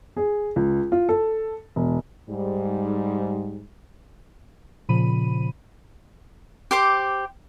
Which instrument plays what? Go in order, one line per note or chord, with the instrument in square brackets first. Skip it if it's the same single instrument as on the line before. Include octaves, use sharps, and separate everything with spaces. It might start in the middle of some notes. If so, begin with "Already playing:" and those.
[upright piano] G#4
C#2
F4
A4
E1
[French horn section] G#2 G3
[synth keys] A#2 C#3 F3 B5 D#7
[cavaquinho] G4 C5 D6